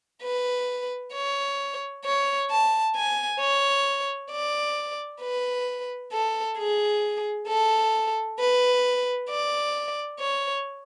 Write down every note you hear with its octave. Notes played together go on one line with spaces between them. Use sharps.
B4
C#5
C#5
A5
G#5
C#5
D5
B4
A4
G#4
A4
B4
D5
C#5